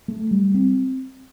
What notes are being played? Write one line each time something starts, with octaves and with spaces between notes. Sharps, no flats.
A3
G3
C4